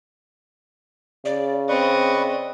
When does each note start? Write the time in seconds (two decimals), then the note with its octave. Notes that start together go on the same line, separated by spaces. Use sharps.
1.25 C#3 D5
1.69 C4 B4 D5 D#5 C#6